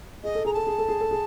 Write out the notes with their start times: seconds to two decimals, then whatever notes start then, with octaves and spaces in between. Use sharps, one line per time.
0.24 G#4 D#5
0.35 A4
0.45 G#4 A#5
0.54 A4 A5
0.67 G#4
0.78 A4
0.88 G#4
1.01 A4
1.11 G#4